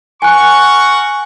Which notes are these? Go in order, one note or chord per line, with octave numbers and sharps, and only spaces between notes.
A#4 F#5 G#5 C#6 F#6